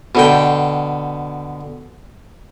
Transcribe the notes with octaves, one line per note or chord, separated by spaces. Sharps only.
B2 D3 G5